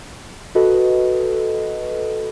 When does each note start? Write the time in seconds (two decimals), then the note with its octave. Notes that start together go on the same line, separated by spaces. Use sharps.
0.55 F#4 A4 B4 D#5